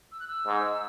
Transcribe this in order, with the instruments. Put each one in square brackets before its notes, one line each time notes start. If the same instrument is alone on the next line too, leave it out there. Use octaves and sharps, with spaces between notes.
[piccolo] E6
F#6
E6
[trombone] G#2